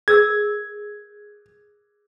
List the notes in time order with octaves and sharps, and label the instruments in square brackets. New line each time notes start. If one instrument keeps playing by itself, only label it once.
[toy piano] G#4 A#4 E6 [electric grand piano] G#6